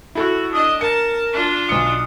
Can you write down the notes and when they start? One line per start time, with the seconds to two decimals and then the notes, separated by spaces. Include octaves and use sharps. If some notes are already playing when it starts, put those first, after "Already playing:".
0.15 E4 F#4 A4
0.53 D4 D#5 D#6
0.81 A#4 A5 C#7
1.32 D4 F4
1.69 B1 D#6 C#7